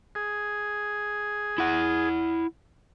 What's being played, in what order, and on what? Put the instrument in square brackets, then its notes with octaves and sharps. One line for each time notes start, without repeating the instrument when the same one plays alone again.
[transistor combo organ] G#4
[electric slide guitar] E4 F#5